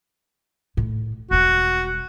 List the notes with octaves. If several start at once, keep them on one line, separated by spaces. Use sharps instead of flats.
A2 D#3
E1 G3 F#4